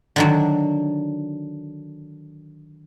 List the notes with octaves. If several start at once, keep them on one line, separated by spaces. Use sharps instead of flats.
D3 D#3 F#3